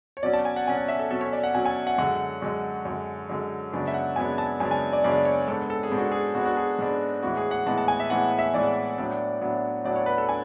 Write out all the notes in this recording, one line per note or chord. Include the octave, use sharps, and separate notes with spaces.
C#5
B2 F#3 C#4 D5
A5
G#5
F#5
B2 F#3 C#4 G#5
F#5
E5
A4
B2 F#3 C#4 A4
C#5
D5
F#5
B2 F#3 C#4 G#5
G#5
F#5
F#2 D3 G#3 F#5
F#2 D3 G#3
F#2 D3 G#3
F#2 D3 G#3
F#2 C#3 G#3 B3 D4
E5
F#5
F#2 C#3 G#3 B3 D4 G#5
A5
F#2 C#3 G#3 B3 D4 G#5
G#5
D5
F#2 C#3 G#3 B3 D4 D5
C#5
G#2 G#3 B3 D4 A4
A4
G#4
G#2 G#3 B3 D4
F#4
G#4
G#2 G#3 B3 D4 F#4
F#4
G#4
G#2 G#3 B3 D4
A2 E3 G#3 B3 F#4
G#4
F#5
A2 E3 G#3 B3 A5
A5
G#5
E5
A2 E3 G#3 B3 F#5
E5
A2 E3 G#3 B3 D5
A2 F#3 B3 D4
A2 F#3 B3 D4
A2 F#3 B3 D4 D5
C#5
B4
A4
D4 G#5